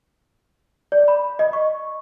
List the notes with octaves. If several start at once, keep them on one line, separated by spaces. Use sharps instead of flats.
D5
B5
D#5
C#6